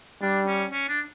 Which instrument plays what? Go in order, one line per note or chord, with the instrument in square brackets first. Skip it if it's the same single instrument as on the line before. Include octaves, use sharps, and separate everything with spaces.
[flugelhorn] G3 [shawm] D4
[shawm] C#4
C#4
D4